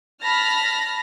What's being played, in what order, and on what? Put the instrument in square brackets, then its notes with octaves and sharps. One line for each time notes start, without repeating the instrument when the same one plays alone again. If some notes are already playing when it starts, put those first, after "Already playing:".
[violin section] A5 B5 F6 A#6